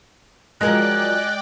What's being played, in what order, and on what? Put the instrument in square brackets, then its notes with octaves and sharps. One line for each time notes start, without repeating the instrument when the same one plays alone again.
[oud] F3 F#3 A#4 [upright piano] G#3 [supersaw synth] D5 G5 [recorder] F#6